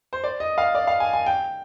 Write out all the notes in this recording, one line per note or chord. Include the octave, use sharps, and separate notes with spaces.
C5
D5
D#5
F5
D5
F5
G#5
G#5
G5